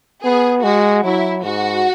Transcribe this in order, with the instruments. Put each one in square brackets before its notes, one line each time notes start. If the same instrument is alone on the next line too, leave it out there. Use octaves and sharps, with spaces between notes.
[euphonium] B3 [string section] G#4
[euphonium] G#3 [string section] F#4
[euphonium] F#3 [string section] E4
[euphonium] G#2 [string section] F#4